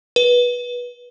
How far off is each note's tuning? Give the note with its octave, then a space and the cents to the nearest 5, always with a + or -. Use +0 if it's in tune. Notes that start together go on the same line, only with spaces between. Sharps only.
B4 -20